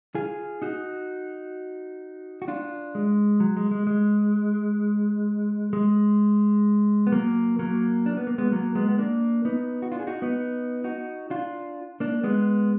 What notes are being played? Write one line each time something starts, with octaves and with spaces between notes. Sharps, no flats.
F4 G#4
D#4 F#4
F#4
D4 F4
G#3
F#3
G#3
G#3
G#3
G#3
B3
F#3 A#3
F#3 A#3
D4
B3
A#3
G#3 B3
F#3 A#3
G#3 B3
B3
A#3 D4
B3 D#4
F#4
D4 F4
G#4
D#4 F#4
B3 D#4
D#4 F#4
D4 F4
A#3 D4
G#3 B3